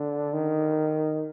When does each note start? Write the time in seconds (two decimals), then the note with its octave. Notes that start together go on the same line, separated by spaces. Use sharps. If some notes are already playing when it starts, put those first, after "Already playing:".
Already playing: D3
0.34 D#3